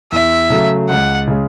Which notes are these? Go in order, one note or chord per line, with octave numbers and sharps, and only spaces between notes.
E2 E5
C#3 F#3 A3
C#2 F#5
C#3 G#3